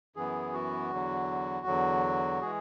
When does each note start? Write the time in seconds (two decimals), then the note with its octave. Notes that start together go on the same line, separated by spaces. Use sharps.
0.16 F#2 E3 B3 G#4
0.53 F#4
0.91 E2 D3 F#3
1.66 E2 D3 F#3
2.41 E3 G#3 G#4